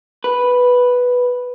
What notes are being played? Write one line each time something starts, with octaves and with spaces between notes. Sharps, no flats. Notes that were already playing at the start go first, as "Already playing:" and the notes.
B4